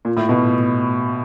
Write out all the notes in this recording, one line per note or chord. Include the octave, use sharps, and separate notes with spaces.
A#2
A2
B2